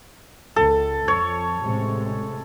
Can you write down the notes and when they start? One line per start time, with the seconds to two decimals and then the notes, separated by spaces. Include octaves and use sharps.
0.56 C#2 A4
1.08 F2 C#5
1.61 A1 C3 G#3